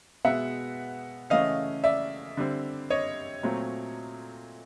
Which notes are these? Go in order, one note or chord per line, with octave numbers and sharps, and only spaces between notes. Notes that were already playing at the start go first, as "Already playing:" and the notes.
B2 G#3 B3 E5 F#5
C#3 E3 A3 C#4 D#5 F5
D5 E5
D3 G3 C4
C#5 D#5
A#2 F#3 A3 C4